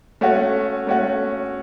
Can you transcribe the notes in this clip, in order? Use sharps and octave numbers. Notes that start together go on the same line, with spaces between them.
A3 C#4 F#4
A3 C#4 F#4